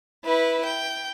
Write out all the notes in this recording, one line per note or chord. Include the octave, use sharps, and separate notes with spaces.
E4 B4
G5